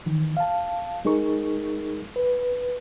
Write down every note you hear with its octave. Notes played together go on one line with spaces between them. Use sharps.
D#3 E3
F5 A5
G#3 D#4 G#4 A#4 C#6
B4